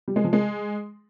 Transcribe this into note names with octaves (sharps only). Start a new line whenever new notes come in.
G3
G#3
F3
G#3